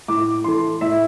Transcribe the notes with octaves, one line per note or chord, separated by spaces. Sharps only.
A2 D6
E3 A3 C6
A2 E5